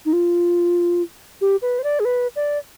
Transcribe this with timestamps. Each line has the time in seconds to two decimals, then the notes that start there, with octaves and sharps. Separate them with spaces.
0.05 D#4
0.13 F4
1.41 G4
1.62 B4
1.79 C5
1.84 D5
2.00 G#4
2.05 B4
2.36 D5